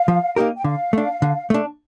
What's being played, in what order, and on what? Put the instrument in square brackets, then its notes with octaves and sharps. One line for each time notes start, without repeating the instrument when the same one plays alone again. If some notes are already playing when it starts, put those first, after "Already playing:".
Already playing: [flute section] F5
[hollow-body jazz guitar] F3
A#3 D#4 G4 A#4
[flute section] G5
[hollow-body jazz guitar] D3 [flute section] F5
[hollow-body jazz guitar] A3 D4
D3
A3 D4